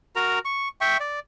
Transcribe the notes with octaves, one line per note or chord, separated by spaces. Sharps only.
F#4 A#4 A#5
C#6
E5 G5 C#6
D5